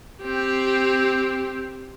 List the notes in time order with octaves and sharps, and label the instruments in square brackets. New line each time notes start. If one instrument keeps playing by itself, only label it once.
[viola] C4 G4